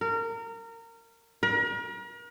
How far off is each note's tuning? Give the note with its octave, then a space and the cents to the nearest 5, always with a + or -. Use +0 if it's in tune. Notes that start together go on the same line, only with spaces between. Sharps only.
A#4 -25
A#4 +40